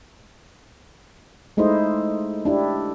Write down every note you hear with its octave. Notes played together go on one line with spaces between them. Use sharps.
G#3 A3 D#4 E4 C5 D#5
D4 E4 G4